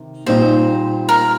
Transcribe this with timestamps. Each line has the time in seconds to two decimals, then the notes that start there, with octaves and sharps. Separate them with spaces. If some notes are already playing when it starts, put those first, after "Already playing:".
Already playing: C3 D#3
0.26 A#2 G3 C4 D#4 G4 C5
1.09 A#4